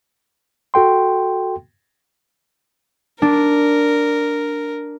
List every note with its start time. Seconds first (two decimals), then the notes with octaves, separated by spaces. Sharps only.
0.74 F#4 A4 G5 C6
3.22 D4 A#4